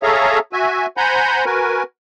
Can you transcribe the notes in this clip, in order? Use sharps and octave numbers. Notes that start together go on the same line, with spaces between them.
G#4 A4 C#5 E5 F5 A#5
F#4 E5 G#5
C5 F#5 G#5 A#5 B5 G6
F#4 A#4 B4 G#5